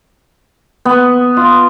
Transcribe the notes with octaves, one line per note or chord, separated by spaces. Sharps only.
B3
F4